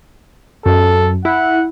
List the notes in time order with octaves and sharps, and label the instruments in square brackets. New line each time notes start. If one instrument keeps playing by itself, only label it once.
[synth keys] F#2 [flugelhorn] A4
[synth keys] E4 [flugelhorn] F#5